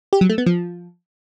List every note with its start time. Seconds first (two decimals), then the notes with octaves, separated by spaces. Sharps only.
0.13 G4
0.21 F#3
0.30 A3
0.38 B3
0.46 F3